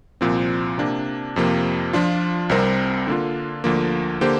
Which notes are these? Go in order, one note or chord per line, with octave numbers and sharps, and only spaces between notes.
C2 A#2 F3 C4
C3 A#3 D4
F2 C3 F3 A#3
F3 D4 F4
C2 C3 G3 C4 A#4
D3 A#3 D4 F4
D2 D3 F3 A#3
D3 A#3 G4 C5